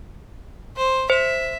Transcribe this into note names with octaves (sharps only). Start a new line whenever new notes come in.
C5
C5 E5